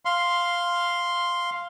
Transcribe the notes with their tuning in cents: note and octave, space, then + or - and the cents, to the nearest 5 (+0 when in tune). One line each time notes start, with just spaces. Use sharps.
F5 +0 C6 +0